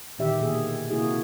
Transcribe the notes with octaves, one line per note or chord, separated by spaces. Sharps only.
A#2 D3 D#3 G4 E5
B2 D#3 A#3 G#4
C3 A#3 E4 F#4 G#4